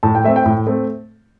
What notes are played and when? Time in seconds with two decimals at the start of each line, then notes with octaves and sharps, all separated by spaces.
0.03 A2 A5
0.15 G5
0.24 A3 C4 E5
0.36 G5
0.46 A2
0.67 A3 C4